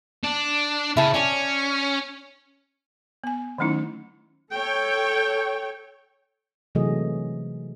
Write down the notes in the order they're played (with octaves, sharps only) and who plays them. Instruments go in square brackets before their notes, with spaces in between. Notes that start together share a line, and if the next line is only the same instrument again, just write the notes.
[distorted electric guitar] D4
[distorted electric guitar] C#3 [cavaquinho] E4 A5
[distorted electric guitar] C#4 [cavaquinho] D5 A5
[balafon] B3 G#5
D#3 F#3 A3 C#4 D#4 E4
[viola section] A4 C#5 G5
[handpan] C3 E3 F#3 A3 G#4 D#5